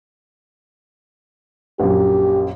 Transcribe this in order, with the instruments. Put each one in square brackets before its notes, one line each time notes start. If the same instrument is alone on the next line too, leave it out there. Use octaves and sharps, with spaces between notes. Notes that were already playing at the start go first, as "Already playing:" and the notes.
[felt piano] A#1 F#2 [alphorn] G4